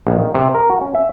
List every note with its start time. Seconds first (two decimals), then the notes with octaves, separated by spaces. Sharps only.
0.07 A#1
0.19 D#3
0.34 C3
0.54 A#4
0.70 F#4
0.81 C#4
0.95 E5